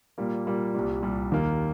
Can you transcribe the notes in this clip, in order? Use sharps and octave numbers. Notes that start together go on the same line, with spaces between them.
A#2 G3 A#3
A#2 G3 A#3
C2 A#2 G3
C2 A#2 G3
D#2 D#3 A#3